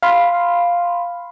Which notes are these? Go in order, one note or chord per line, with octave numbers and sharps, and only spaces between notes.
F5 B5 C6